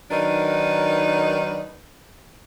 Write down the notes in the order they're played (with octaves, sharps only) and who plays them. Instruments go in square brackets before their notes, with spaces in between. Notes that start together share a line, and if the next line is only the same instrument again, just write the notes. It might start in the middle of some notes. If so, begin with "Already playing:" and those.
[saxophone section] D#3 F#3 D4 D#4 A#4 B4